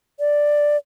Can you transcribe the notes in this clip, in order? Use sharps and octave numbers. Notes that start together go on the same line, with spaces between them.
D5